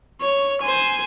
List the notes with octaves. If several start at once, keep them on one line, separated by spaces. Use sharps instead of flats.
C#5
C5 G#5